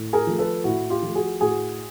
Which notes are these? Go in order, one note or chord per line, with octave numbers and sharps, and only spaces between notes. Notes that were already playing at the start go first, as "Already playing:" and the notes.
Already playing: A2
G#4 A#4
F3 A3
A4 B4
A2 E4 F#4
F4 G4
F3 A3
F#4 G#4
A2 F#4 G#4